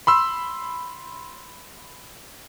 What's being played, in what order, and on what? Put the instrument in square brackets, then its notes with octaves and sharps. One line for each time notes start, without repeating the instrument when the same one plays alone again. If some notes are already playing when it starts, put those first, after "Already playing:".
[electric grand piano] B5 C6 E6